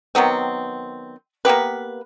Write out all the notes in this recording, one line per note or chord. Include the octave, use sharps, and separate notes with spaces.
D#3 F#3 B3 C4
A#3 B3 G4 B4